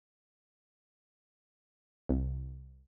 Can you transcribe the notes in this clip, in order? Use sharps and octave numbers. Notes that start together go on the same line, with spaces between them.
C2